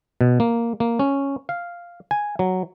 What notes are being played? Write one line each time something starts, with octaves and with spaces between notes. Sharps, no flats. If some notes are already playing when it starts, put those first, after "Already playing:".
B2
A#3
A#3
C#4
F5
G#5
F#3